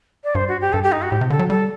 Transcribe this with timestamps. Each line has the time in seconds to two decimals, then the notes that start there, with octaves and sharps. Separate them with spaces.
0.24 D5
0.35 G2 C5
0.48 F#4
0.61 G4
0.73 G2 A4
0.83 G4
0.92 D#4
1.02 F#4
1.11 A2 G4
1.21 C3
1.30 D3 A4
1.39 F#3
1.50 G3 A4